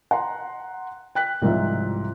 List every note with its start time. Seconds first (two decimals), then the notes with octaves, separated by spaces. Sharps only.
0.11 F#5 A#5 C6
1.15 G5 F#6 B6
1.42 C2 G#2 F3 E5